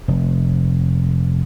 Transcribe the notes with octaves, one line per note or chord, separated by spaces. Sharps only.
F1